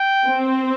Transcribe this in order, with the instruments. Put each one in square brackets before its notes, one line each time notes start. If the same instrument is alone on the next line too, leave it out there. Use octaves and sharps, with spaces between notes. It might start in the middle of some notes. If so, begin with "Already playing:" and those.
Already playing: [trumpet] G5
[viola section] C4